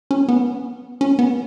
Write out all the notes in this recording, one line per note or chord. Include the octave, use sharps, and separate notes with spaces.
C#4
B3
C#4
B3